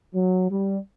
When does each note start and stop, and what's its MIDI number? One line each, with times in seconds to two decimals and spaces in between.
0.14 0.47 54
0.50 0.79 55